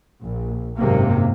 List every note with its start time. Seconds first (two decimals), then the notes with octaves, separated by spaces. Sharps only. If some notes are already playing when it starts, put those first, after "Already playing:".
0.22 A#1
0.79 G#1 F#2 C3 A#3